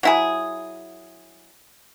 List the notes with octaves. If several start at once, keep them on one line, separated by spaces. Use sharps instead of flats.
F#3 E4 G#4